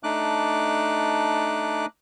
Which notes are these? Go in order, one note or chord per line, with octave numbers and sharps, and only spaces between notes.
A3 D4 D#4 D6 F#6